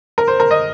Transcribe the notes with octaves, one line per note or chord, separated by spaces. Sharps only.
A#4
C5
A#4
D#5